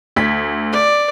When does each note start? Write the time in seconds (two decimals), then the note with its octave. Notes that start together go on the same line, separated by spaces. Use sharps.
0.16 D2 G#6 B6
0.73 D5